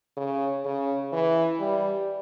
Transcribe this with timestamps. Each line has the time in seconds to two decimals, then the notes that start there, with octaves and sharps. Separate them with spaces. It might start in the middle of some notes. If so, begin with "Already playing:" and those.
0.17 C#3
0.65 C#3
1.12 E3
1.59 G3